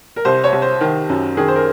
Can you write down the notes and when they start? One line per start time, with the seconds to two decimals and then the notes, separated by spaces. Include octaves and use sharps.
0.16 A#4
0.25 C2 C5
0.44 C#5
0.52 C2
0.62 C5
0.81 D#3
1.09 F#2
1.37 D#3 G#4
1.48 C5
1.56 A#4